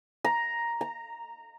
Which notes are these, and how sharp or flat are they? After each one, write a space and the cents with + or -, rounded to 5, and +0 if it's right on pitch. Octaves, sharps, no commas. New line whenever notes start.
A#5 +5
A#5 -15